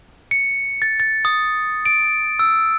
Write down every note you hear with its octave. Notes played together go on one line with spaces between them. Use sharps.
C#7
A6
A6
D#6
D7
E6